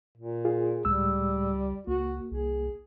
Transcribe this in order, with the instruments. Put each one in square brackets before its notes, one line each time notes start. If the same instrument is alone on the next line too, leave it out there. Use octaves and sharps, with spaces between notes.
[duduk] A#2
[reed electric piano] F4 G#4
[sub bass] C#2 [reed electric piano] A2 G#3 E6 [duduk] G3
[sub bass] C#2 [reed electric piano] A#3 [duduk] F#4
[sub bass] C2 [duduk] G#4